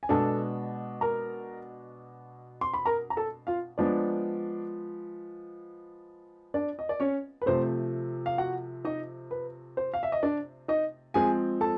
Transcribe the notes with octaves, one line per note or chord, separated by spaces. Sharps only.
G#5
B2 G#3 B3 D4 A4 A5
A#4 A#5
C6
B5
A#4 A#5
A#5
A4 A5
F4 F5
F3 G#3 B3 D4 D5
D4 D5
D#5
D5
C#4 C#5
B4
C3 F3 A3 C5
F5
F#4 F#5
D#4 D#5
B4
C5
F5
E5
D#5
D4 D5
D#4 D#5
F3 G#3 C4 G#4 G#5
A4 A5